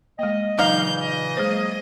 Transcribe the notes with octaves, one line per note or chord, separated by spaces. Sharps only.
G#3 A#3 D#5
A#2 C#3 E3 F#3 D#4 F5 G6
D#5
F#3 G#3 A#3 G#4 C5